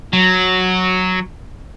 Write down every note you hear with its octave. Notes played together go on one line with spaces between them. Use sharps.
F#3